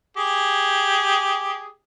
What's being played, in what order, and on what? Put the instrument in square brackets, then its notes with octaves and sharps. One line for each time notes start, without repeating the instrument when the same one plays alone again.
[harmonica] G4 G#4